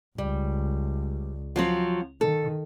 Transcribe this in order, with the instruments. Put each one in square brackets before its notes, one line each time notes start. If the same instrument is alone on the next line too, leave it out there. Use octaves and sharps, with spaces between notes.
[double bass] C#2 [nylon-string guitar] G3
[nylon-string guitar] F3 F#3 C4
[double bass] D#3 [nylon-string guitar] A4